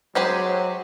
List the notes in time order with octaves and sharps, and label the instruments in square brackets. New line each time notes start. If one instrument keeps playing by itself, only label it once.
[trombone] F#3 [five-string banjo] G#3 G4 G#4 [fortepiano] C5 G5